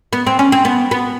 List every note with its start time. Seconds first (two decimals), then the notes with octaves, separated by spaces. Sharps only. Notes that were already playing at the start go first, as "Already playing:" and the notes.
0.13 B3
0.27 C4
0.39 C#4
0.52 C4
0.65 B3
0.91 B3